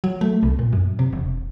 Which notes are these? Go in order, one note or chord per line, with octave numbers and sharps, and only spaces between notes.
F#3
A3
C2
A#2
F#2
C3
E1